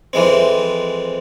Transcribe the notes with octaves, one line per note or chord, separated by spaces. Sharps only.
F2 E3 G#3 C4